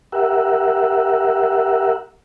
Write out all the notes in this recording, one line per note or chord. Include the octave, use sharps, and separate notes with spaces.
G4 A#4 E5 F#5